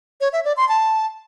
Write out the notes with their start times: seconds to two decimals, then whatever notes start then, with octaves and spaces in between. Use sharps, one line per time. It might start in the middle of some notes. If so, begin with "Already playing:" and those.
0.21 C#5
0.33 E5
0.45 D5
0.57 C6
0.69 A5